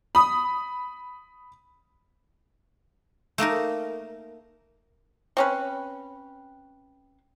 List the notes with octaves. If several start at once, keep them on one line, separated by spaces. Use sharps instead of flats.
B5 D#6
A3 A#3 D#4 A#4
C4 C#4 B4